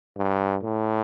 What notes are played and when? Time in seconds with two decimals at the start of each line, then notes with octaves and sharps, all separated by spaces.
0.17 G2
0.63 A2